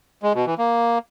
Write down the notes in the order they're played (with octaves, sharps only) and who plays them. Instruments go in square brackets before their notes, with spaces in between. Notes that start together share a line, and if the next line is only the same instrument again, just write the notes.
[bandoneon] G#3
B2
E3
A#3